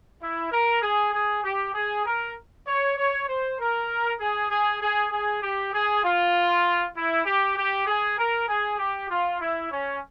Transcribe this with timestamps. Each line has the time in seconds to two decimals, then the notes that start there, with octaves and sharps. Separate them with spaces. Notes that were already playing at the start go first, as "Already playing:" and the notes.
0.21 E4
0.51 A#4
0.82 G#4
1.13 G#4
1.44 G4
1.74 G#4
2.05 A#4
2.67 C#5
2.97 C#5
3.27 C5
3.58 A#4
4.19 G#4
4.50 G#4
4.81 G#4
5.11 G#4
5.42 G4
5.73 G#4
6.03 F4
6.95 E4
7.26 G4
7.56 G4
7.87 G#4
8.18 A#4
8.48 G#4
8.79 G4
9.09 F4
9.40 E4
9.71 C#4